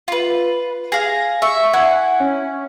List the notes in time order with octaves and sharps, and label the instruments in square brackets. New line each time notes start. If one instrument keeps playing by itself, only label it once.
[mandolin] F4 B4
[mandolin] G#4 F5 [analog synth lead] A#6
[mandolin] E5 [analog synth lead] C#6
[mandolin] E4 G#5 [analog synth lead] F#5
[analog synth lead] C#4